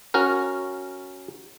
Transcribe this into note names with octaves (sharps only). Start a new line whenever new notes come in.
C#4 F#4 A#4